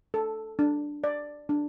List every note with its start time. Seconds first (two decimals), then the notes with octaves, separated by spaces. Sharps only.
0.14 A4
0.59 D4
1.04 D5
1.49 D4